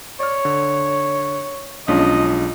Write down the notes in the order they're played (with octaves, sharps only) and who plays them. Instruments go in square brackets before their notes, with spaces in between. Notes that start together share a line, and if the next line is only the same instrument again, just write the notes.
[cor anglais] C#5 [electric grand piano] D5 F6
[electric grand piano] D3
[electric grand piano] B1 G#3 F4 [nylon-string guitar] F3 C#4 D4 [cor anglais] D#5